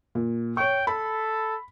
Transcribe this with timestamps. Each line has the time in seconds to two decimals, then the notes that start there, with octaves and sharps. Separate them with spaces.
0.15 A#2
0.57 C#5 G5 C#6
0.87 A4 B5